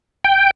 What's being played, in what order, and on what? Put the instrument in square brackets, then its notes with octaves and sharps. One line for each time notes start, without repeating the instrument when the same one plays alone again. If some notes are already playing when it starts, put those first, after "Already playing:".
[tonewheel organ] G5